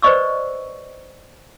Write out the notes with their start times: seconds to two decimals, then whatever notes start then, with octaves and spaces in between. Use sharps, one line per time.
0.02 B4 C5 D5 D#5 C#6 E6